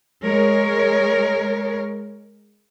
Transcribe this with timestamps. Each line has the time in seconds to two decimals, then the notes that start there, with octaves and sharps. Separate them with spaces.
0.23 G#3 A#4 C#5